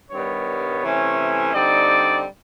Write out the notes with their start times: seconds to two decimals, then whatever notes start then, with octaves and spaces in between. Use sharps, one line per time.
0.11 G2 D#3 G3 B3 C#5
0.83 C3 E3 A3 C#4
1.54 D3 G3 C4 D#4 D5